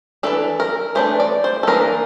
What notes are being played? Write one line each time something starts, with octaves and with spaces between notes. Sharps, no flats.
E3 A3 D4 A4
A#4
E3 A3 D4 C5
D5
C5
A4
E3 A#3 D4 A#4